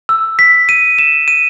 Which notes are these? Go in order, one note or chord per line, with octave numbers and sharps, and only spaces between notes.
E6
B6
D#7
E7
D#7